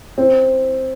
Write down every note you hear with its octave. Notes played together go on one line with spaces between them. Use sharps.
C4